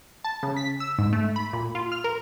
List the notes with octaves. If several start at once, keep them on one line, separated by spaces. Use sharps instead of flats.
A5
C#3
B6
E6
G#2
A3
B5
A#2
F4
F6
A#4